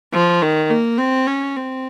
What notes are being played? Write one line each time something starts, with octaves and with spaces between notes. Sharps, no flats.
F3
D#3
A#3
C4
C#4
C4